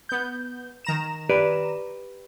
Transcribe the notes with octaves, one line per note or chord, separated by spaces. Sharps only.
B3 G6
D#3 A#5 E7
G4 B4 D5